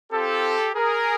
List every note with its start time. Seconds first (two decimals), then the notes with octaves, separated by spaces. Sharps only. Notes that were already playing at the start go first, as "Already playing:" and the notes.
0.12 C4 F4 G4 A4
0.75 G#4 A#4